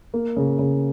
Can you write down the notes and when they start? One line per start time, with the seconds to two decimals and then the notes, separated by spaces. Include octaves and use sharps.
0.14 A#3
0.37 C#3
0.59 C#3